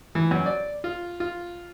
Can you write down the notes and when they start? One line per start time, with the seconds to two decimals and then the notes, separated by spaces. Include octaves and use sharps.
0.15 E3
0.31 F#2
0.46 D5
0.84 F4
1.20 F4